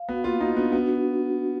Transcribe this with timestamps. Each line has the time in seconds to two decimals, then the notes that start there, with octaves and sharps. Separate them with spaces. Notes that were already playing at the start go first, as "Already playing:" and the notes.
Already playing: F5
0.09 B3 F#4
0.24 A#3 F4
0.41 D#4 F#4
0.56 B3 D4
0.72 B3 F#4